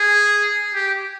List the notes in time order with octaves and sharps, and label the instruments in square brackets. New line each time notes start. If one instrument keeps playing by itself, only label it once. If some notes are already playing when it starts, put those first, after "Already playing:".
Already playing: [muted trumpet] G#4
G4